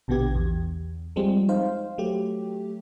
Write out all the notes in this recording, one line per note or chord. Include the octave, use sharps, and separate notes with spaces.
A#1 B2 D3 B3 G4 G#6
E2
F3 G3 G#3 C4
D#4 C5 F5
F#3 A3 G4